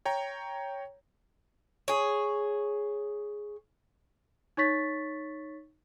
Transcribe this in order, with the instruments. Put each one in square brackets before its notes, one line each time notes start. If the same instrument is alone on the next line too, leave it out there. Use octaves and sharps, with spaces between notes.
[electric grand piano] C#5 G5 A#5
[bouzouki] G#4 C#5
[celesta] D#4 C#5 C#6 A6 B6